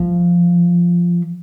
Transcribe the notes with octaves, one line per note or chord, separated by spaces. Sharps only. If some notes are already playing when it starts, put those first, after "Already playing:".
Already playing: F3